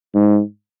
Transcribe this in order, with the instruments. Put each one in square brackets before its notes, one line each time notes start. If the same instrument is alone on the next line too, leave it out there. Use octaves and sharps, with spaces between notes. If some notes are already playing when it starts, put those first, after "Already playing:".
[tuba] G#2